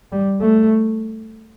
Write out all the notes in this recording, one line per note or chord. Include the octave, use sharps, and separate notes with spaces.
G3
A3